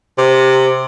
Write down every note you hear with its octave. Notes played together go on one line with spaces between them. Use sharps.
C3